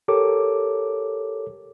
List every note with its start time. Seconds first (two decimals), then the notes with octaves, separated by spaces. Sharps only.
0.08 G4 A4 A#4 C#5 D6